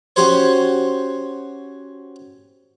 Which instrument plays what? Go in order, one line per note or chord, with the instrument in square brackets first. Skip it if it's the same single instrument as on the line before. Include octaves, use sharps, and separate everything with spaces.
[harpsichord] C#4 F#4 G4 C5 C#5